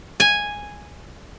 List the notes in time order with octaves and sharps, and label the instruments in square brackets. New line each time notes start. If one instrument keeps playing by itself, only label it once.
[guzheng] G#5